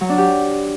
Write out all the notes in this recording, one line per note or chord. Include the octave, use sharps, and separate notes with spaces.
F#3
D4
G4